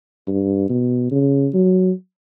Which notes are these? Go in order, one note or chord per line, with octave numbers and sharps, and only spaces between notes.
G2
B2
C#3
F#3